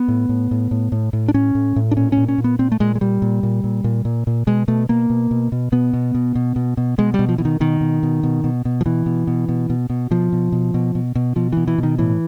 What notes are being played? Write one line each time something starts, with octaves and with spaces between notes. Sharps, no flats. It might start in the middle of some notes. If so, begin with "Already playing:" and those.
Already playing: B3
A2
A2
A2
A2
A2
A2
D4
A2 C#4
A2
A2
D4
A#2 C#4
C#4
A#2
C#4
A#2
B3
A#2 C4
A3
A#2 G#3
G#3
A#2 G3
A#2
A#2
A#2
A#2
A#2
A#2
B2 G#3
B2 A3
B2 A#3
B2
B2
B2
B2 B3
B2
B2
B2
B2
B2
B2 G#3
G3
B2
F3
B2 E3
D#3
B2 D#3
B2
B2
B2
B2
B2
F3
B2 E3
B2
B2
B2
B2
B2
B2 F3
B2
B2
B2
B2
B2
B2 F3
B2 E3
E3
B2 D#3
A2 E3